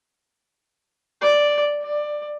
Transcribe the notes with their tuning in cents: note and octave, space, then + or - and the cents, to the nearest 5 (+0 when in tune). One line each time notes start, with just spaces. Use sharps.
D5 +0
D5 +15